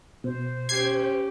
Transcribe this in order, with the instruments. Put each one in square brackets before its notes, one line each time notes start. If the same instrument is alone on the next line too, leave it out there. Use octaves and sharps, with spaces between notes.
[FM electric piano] B2 [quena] C5
[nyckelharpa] C#4 G4 [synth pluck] G#6 C7